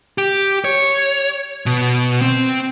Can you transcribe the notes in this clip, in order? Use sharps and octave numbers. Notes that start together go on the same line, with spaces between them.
G4
C#5
B2
C4